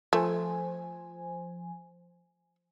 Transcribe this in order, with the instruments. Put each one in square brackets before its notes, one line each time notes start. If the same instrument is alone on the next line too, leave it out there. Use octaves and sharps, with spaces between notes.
[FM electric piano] F3 C5 G#5 [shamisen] A3